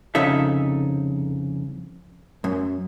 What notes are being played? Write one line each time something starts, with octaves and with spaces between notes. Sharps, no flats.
C2 F2 C#3 D#4 A4 E5
F#2